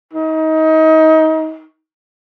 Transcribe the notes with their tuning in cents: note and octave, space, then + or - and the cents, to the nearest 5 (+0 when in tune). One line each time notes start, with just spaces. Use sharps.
D#4 +25